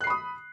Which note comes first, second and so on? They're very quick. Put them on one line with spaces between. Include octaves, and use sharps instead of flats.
F#6 C7 B5 D#6